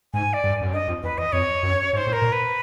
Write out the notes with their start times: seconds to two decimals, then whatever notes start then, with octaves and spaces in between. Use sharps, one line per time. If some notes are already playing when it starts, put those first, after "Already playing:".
0.14 G#2 G#5
0.33 D5
0.44 G2
0.61 F#2
0.73 G2 D#5
0.88 F2
1.03 E2 B4
1.18 E2 D#5
1.32 F2 C#5
1.63 F#2
1.93 G#2 C#5
1.97 C5
2.07 A2
2.13 A#4
2.22 A#2
2.32 B4